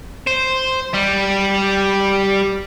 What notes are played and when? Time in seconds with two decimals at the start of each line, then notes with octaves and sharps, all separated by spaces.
0.27 C5
0.94 G3